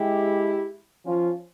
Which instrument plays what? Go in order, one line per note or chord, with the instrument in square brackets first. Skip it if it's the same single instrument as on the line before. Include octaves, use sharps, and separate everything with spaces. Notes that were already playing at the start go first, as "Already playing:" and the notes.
Already playing: [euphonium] G#3 [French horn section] E4 G4
[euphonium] F3 [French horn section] C#4 F4